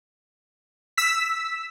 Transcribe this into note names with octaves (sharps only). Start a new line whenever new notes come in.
E6 B6